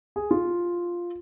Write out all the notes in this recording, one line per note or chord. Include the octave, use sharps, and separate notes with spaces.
G#4
F4